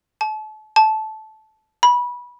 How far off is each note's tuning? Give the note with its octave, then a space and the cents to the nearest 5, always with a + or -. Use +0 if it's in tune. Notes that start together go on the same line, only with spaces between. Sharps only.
A5 -35
A5 -15
B5 -20